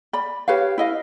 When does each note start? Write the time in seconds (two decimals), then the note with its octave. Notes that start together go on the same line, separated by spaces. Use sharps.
0.13 D5 B5
0.48 G4 B4 C#5 F5
0.78 E4 D#5 F5